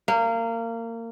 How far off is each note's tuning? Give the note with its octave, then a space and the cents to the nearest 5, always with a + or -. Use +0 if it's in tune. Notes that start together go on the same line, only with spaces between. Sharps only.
A#3 -25